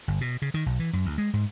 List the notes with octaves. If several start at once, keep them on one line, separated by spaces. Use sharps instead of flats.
G1
B2
C#3
D#3
B1
E3
F#2
D2
G#3
G#2